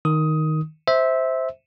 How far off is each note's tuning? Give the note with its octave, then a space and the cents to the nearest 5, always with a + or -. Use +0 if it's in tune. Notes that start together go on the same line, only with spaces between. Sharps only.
D#3 +0 D#6 +15
C5 +0 E5 -15